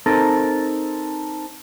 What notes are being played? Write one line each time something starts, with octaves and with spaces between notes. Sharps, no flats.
C4 D#4 A4 A#4